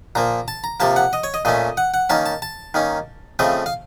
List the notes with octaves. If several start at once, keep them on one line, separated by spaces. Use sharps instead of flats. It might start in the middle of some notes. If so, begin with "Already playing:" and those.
A#2 F3 A#3 A#5
A5
A#5
C3 F3 A#3 A5
F#5
D#5
C#5
D#5
A#2 A3 C#4 D#5
F#5
F#5
D#3 A#3 C#4 A5
A5
A5
D#3 A#3 C#4
C#3 F3 A3 C4 D#5
F5